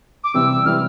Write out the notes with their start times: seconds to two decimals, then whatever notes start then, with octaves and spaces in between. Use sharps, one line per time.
0.24 D6
0.34 C3 E3 G3 C4 E6
0.65 C3 E3 G3 C4 F6